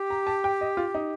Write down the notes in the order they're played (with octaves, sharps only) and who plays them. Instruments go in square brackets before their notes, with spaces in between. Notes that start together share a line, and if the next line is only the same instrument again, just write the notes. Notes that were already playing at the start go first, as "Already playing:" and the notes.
Already playing: [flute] G4
[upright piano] A#5
A5
G5
D#5
F4
D#4